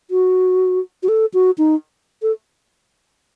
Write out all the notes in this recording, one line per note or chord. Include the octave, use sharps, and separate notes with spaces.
F#4
F#4
A4
F#4
D#4
A4